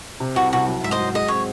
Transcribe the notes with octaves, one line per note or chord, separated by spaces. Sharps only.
C3
C2 F#4
C2 F#4
F#3
G#2 E5
C5 D#5
F#3
G#3 D#5
C4 C#5